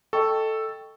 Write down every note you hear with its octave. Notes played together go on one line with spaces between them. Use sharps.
A4 D#5 G5 C#6